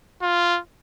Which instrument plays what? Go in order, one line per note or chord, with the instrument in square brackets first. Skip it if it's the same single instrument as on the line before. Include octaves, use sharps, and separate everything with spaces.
[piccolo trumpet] F4